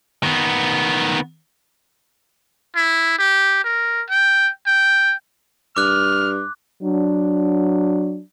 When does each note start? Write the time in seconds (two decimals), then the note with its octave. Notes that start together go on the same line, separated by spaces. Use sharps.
0.23 D#3 B3
2.75 E4
3.18 G4
3.64 A#4
4.10 G5
4.66 G5
5.77 G2 D6 F6 F#6
6.83 F#3 D4